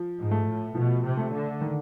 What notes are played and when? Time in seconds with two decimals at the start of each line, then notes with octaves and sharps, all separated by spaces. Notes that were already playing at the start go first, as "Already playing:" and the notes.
Already playing: F3
0.17 G#2
0.31 A3
0.46 A2
0.75 B2 F3
1.04 C3
1.17 A3
1.32 D3
1.61 D#3